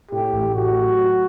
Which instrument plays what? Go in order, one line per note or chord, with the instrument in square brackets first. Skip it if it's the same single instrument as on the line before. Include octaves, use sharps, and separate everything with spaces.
[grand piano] A2 [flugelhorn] G4
[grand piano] A1
[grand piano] A2 [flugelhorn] F#4
[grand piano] F#3
F#3